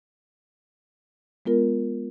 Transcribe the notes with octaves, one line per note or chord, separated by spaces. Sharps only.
G#3 B3 F4 A#4